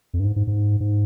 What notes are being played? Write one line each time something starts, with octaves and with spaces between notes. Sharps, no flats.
F2
G2
G#2
G#2
G#2
G#2